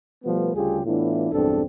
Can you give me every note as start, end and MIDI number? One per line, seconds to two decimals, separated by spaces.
0.24 0.52 47
0.24 0.52 53
0.24 0.52 55
0.24 0.52 57
0.24 0.52 59
0.55 0.82 38
0.55 0.82 49
0.55 0.82 55
0.55 0.82 65
0.55 0.82 67
0.55 0.82 68
0.85 1.31 45
0.85 1.31 52
0.85 1.31 59
0.85 1.31 62
0.85 1.31 64
0.85 1.31 65
1.32 1.62 35
1.32 1.62 40
1.32 1.62 43
1.32 1.62 60
1.32 1.62 62
1.32 1.62 69